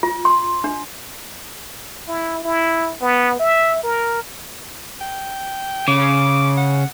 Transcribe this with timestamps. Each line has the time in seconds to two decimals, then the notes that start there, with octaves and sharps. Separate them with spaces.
0.03 F4
0.25 C6
0.64 D4
2.08 E4
2.44 E4
3.02 B3
3.40 E5
3.84 A#4
5.01 G5
5.88 C#3 D6
6.57 F#5